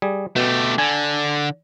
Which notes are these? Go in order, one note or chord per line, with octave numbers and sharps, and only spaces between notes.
G3 G#4
B2 A3 G4
D3 G#5